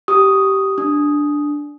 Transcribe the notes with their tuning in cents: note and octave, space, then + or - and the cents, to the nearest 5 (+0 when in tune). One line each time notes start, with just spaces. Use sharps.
G4 -15 D#6 +0
D4 +0 D#6 +0